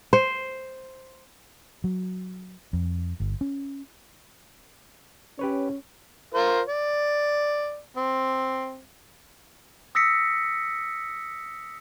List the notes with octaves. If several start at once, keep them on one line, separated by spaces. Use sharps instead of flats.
C5
F#3
F2
G1
C#4
C#4 G4 B4 C#5
F4 A#4 C5
D5
C4
D#6 E6 A#6 B6 C#7